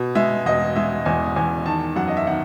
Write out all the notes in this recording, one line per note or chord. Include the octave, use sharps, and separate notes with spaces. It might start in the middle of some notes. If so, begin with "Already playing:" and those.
Already playing: B2
G#3 E5
E1 D#5
G#3 E5
E2 G#5
E2 G#5
D#3 A5
F#2 F#5
D#5
E5
D#3 F#5